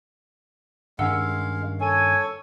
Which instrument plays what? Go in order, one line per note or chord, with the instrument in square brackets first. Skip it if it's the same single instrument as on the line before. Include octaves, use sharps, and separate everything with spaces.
[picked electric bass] G2 D#3 C#4 [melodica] G#3 F5 [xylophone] F#5 E6
[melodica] A4 C#5 [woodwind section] G#5